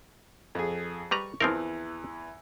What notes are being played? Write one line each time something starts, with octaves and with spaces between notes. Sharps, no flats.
F2 G#4
G3 B4 A#5 C#6
E2 E3 F3 C4 A#4